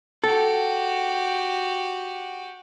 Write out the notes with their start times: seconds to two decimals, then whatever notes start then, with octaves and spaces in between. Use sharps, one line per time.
0.24 F#4 G4 A4